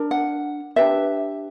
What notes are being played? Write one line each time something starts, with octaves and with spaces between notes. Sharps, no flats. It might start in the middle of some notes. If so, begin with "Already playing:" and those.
Already playing: D4 A#4
F#5
D4 G4 B4 E5